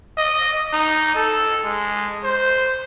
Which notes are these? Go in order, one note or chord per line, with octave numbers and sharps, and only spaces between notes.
D#5
D#4
A4
G#3
C5